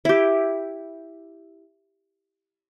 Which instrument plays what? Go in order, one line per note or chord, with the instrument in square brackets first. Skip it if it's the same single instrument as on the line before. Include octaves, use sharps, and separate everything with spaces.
[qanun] E4 G4